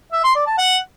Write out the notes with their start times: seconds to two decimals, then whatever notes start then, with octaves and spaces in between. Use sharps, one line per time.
0.13 E5
0.24 C6
0.35 D5
0.47 A5
0.58 F#5